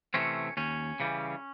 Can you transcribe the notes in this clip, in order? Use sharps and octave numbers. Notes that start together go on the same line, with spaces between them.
C3 E3 A3 C4 C#4
D#2 C#4
C#3 E3 G3